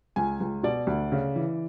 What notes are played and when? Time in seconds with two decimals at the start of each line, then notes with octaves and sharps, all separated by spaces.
0.16 C#2 G#5
0.40 C#2
0.63 B2 D5
0.87 D2
1.12 C#3
1.36 E3